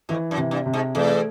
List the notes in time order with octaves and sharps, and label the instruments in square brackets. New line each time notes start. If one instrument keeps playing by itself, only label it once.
[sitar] F2 [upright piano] E3
[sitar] F#2
[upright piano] C3
[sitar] G2
[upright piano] C3
[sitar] G#2
[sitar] E2 [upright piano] A3